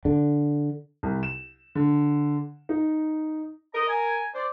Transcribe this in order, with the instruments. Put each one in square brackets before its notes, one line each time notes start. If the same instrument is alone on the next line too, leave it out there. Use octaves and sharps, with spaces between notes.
[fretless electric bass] D3
[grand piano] C2
E7
D3
D#4
[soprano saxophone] A#4 [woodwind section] D#5 A#5
[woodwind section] G#5
[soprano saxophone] C5 [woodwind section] D5